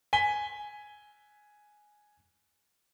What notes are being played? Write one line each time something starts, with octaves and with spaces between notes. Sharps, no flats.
G#5 B6 G7